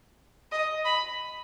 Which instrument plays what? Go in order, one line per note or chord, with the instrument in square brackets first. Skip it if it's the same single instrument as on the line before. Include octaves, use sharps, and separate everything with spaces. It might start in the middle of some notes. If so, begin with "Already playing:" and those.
[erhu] D#5
B5